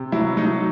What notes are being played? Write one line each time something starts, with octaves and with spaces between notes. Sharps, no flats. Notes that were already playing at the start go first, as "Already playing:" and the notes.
Already playing: C3
F#3 E4
F#3 D#4